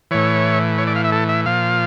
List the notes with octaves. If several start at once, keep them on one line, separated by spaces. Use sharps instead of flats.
A2 E3 C#5
C#5
D5
F5
E5
A4
E5
A#2 F3 F5